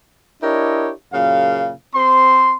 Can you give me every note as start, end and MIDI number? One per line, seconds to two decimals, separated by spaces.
0.42 0.91 62
0.42 0.91 64
0.42 0.91 67
0.42 0.91 70
0.42 0.91 73
0.42 0.91 75
1.13 1.72 42
1.13 1.72 46
1.13 1.72 49
1.13 1.72 77
1.94 2.55 60
1.94 2.55 84